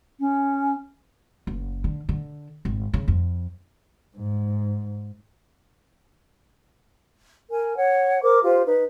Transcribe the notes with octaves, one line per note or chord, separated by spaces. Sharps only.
C#4
F#1
D3
D3
G#1
C#3
F2
G#2
A#4 G#5
C#5 F#5
A#4 C5 D6
F4 G4 C5
D#4 B4